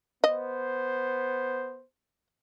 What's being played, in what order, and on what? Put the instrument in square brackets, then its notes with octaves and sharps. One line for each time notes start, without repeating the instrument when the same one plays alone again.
[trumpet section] B3 C5 [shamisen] D#5